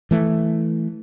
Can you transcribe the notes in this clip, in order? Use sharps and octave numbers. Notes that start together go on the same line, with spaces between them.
E3 A3